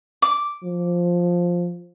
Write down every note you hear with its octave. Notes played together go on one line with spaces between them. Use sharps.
D6
F3